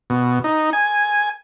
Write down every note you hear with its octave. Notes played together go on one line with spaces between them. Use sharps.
B2
D#4
G#5